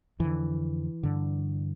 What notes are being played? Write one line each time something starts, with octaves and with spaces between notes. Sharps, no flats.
F2 D3 E3
G2 D3